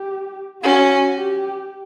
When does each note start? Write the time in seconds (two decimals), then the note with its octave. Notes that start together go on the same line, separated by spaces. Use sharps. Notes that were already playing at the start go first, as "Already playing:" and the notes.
Already playing: G4
0.63 C#4 F#4
1.15 G4